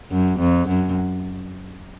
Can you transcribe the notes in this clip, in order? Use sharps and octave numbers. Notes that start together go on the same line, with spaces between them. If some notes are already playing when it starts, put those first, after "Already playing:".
F#2
F2
F#2